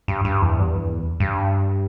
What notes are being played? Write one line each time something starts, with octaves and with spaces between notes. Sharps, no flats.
G2
G2
E2
G2
E2
G2